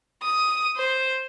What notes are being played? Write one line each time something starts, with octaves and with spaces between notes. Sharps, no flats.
D#6
C5